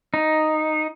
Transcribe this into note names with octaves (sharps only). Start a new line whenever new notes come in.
D#4